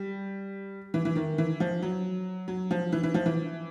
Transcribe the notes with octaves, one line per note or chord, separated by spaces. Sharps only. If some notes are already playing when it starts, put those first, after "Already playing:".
Already playing: G3
E3
E3
D#3
E3
F3
F#3
F#3
F3
E3
E3
F3
E3